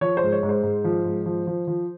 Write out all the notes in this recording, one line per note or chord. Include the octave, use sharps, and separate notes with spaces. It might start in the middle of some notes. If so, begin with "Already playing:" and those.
F3 C#5
C5
G#2
C#5
G#2
C5
G#2
F3
G#2
F3
F3
F3